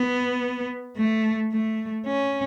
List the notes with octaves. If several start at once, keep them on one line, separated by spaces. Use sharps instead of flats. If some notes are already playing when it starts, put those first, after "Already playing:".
Already playing: B3
A3
A3
C#4